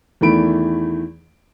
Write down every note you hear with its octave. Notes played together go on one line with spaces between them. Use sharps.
E2 D#3 E3 A3 B5 D7